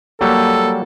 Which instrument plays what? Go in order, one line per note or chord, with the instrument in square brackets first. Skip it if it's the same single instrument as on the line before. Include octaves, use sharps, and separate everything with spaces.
[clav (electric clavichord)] F#3 G3 [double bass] A#3 [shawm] A4